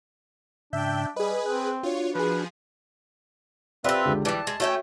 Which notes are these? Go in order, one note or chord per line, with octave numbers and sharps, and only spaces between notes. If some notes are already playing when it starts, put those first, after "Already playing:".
G#2 C#3 D4 E5 G5 G6
G3 G#4 B4 D#5 B5
C4 F#6
D4 F4 F#4 C#5
F3 G#4 B4
C4 F4 G4 A4 B4 D5 E5
C#2 D3 G4
E3 G3 D5 A5 D6
G#3
A3 C#4 F#4 C#5 E5 G5